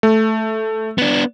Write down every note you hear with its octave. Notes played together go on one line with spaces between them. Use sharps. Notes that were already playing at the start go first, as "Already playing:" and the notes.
A3
B3 D4